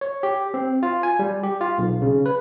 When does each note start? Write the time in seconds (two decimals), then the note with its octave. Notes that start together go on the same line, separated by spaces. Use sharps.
0.01 C#5
0.23 G4
0.54 C4
0.83 F4
1.03 G#5
1.19 G3
1.43 G4
1.61 F4
1.78 B1
2.02 C#3
2.26 B4